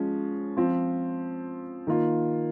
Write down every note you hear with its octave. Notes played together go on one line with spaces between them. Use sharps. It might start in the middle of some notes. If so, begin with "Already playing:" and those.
Already playing: F3 G#3 C#4 F4
F3 C4 F4
D#3 A#3 F4